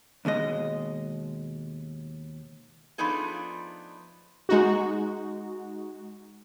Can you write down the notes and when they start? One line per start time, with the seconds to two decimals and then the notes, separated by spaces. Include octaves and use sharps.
0.25 D#2 B2 G#3 D#5
2.98 F3 A3 B3 D4 D#4 G#4
4.49 G#3 D#4 F#4